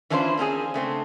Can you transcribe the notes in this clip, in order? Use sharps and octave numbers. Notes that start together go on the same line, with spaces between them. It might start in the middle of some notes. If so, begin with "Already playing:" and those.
E3 C#4 D4 E4 F4 C5
A#3 C4 C#4 G#4
C#3 A3 C4 D4